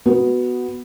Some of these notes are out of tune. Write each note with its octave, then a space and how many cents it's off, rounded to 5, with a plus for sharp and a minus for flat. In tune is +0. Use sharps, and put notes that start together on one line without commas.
B3 +0 F#4 +0